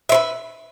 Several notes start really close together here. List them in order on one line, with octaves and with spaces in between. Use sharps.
E5 C5 B4